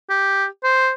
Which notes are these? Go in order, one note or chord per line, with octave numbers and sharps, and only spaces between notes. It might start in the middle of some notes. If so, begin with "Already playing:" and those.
G4
C5